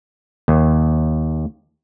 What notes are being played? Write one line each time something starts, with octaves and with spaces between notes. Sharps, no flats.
D#2